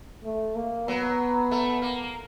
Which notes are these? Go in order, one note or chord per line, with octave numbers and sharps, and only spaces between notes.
A3
A#3
F#3 B3
A3
A#3